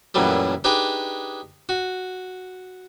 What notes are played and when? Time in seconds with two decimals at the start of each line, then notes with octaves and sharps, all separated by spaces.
0.14 F#2 A#2 E3 F#3 G3 A3
0.64 D4 D#4 G4 G#4 B4
1.69 F#4